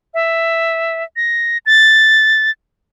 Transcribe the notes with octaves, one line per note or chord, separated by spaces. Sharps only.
E5
A#6
A6